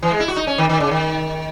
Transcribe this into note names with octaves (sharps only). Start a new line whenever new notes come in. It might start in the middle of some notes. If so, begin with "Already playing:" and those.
E3
G#3
E4
F#4
D#4
C#4
D#3
D#3
C#3
D#3